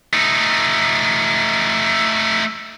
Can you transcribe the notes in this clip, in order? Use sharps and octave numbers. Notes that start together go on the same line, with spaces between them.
A3 D#4